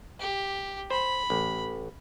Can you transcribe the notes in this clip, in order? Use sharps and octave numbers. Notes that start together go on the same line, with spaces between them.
G4
C5 B5
A1